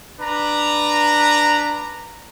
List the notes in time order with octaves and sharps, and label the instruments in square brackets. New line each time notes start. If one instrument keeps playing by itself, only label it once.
[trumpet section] D4 B4 A#5